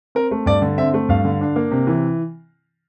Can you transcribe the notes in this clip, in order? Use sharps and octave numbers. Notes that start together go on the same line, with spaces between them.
C4 A#4
A3
G2 D5
D3
C4 E5
A3
G2 F5
D3
D4
A#3
C3
E3